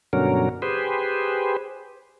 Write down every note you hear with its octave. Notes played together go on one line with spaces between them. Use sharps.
G2 B2 D3 F#3 C#4 A#4
G4 G#4 B4 C5